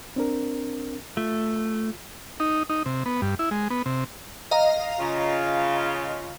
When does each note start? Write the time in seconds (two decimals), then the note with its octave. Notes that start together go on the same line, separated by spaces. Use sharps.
0.16 C4 D4 A#4
1.17 A3 F4
2.40 D#4
2.70 D#4
2.86 C3
3.06 B3
3.22 G2
3.39 E4
3.51 G#3
3.70 B3
3.86 C3
4.51 D#5 F5 A#5
4.99 C#3 F4